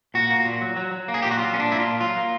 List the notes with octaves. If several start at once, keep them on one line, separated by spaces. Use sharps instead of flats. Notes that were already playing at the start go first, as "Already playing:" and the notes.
A#2 F#4
A#3
A#2
F#3
F#3
F#3
A#3
G#4
A#2 G4
F#4
F#3 F4
A#2 C#4
D4
A#3 E4
F4
A#2
F#3 F4
A#3